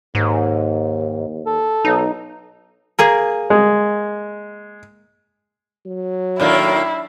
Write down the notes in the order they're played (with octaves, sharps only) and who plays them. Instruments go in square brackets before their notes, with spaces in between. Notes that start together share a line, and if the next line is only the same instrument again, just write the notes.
[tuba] D#2 [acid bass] G#2
[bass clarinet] A4
[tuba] B1 [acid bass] D#4
[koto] A#3 G#4 A#4
[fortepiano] G#3
[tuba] F#3
[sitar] A2 D#3 A#3 [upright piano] D4 [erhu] E4